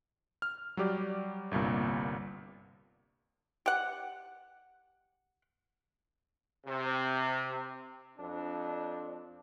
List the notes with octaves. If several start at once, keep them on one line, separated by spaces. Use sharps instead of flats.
F6
F#3 G3 G4 D5
G1 C2 G2 A#2
G4 F#5
C3
F2 D4